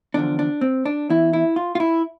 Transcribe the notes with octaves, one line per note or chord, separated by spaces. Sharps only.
E2 D3 F3 D4
D4
C4
D4
E2 E3 E4
E4
F4
F4
E4